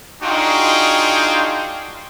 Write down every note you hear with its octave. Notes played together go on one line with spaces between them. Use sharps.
D4 D#4 F4 F#4 G#4 G5